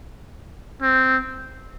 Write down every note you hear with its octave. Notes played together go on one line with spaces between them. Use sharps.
C4